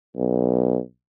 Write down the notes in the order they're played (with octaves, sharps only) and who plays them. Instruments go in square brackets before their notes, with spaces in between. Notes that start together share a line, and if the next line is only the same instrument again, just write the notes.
[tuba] B1